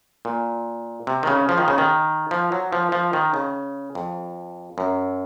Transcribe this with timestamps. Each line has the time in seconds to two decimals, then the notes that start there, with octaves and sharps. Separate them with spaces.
0.25 A#2
1.07 C3
1.23 D#3
1.27 C#3
1.49 F3
1.58 D#3
1.68 C#3
1.78 D#3
2.31 F3
2.52 F#3
2.73 F3
2.92 F3
3.13 D#3
3.34 C#3
3.95 F2
4.78 F#2